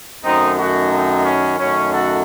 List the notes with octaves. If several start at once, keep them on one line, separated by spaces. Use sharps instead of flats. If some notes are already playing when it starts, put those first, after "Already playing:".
F#2 D#3 A3 C4 D#4
D#4 F#4
C4 D#4
C#4
F#2 D#3 A3 C#4
F#4 A4